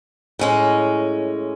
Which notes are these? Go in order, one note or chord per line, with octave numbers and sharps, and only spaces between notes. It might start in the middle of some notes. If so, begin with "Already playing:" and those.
A2 G#3 C#4